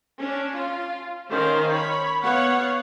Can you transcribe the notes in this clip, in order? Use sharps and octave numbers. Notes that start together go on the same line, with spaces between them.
C#4 D4
F4
D#3 C#4 C5 F5
C#5 B5
B3 C#5 F5 F#5